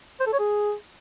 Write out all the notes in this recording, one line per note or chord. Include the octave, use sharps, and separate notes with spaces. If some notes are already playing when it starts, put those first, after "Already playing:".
C5
A4
C#5
G#4